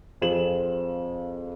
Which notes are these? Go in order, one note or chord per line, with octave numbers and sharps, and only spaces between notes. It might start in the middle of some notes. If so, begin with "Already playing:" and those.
F2 C4 F4 G#4 E7 F#7